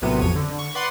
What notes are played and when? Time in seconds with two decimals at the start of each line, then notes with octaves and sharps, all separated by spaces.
0.02 A#1 A2 C3 F#3 B3 D#7
0.21 A1 F2 C#5 D#7
0.35 D3
0.59 C#6
0.75 B4 D5 F#5 C6